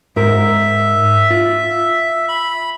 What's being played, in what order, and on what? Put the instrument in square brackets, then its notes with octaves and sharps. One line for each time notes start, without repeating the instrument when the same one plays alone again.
[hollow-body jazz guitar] G#2 A#4 [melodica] E5
[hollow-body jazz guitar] F4
[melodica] B5